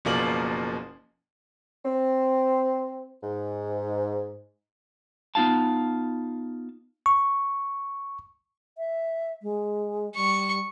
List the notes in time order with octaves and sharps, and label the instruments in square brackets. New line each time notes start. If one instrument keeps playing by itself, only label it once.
[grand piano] F#1 B2 F3 A#3 D5 F#7
[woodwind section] C4
G#2
[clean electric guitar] B3 D#4 F4 F5 A5
[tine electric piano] C#6
[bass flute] E5
G#3
[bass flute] G3 [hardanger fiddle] C#6